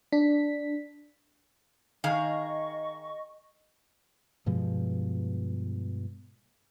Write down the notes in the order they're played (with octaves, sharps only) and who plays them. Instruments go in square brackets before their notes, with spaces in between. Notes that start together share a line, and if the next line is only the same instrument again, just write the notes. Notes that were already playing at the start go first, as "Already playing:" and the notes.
[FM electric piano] D4 B6
[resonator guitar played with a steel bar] D#3 G#4 F5 [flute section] D#5 C#6
[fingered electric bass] G2 B2 F3 G#3